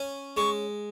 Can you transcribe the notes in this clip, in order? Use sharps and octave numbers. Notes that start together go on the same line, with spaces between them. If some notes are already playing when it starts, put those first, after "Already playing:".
Already playing: C#4
G#3 C#6